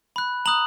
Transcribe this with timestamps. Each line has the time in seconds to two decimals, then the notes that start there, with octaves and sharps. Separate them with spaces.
0.16 B5 F#6
0.46 A#5 D#6 F#6 F#7